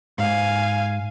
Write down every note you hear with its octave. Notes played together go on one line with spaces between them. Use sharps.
G#2 F5 G#5